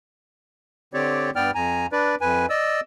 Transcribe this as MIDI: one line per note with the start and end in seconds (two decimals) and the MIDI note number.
0.94 1.30 50
0.94 1.30 60
0.94 1.30 67
0.94 1.30 73
0.94 1.30 74
1.36 1.51 43
1.36 1.51 59
1.36 1.51 74
1.36 1.51 79
1.36 1.51 89
1.55 1.86 41
1.55 1.86 80
1.55 1.86 82
1.92 2.15 62
1.92 2.15 71
1.92 2.15 74
2.21 2.46 41
2.21 2.46 71
2.21 2.46 80
2.50 2.80 74
2.50 2.80 75
2.50 2.80 88